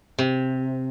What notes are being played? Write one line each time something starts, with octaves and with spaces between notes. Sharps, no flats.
C3